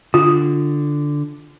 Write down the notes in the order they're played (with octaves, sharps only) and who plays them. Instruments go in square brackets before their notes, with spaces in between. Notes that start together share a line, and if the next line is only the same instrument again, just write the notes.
[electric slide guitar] D3 [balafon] F4